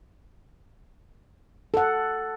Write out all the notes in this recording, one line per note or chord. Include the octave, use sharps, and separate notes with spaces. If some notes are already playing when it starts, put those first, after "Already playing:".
A4 F#5